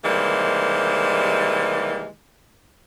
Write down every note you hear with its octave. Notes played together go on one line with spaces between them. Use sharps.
C3 D#3 E3 G3 G#3 A#3